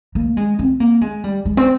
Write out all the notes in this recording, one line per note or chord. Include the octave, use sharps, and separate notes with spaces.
A#3
G#3
C4
A#3
G#3
G3
G#3
C4